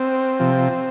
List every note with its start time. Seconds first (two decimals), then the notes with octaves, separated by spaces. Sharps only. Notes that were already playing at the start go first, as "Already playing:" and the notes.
Already playing: C4
0.40 C3 F3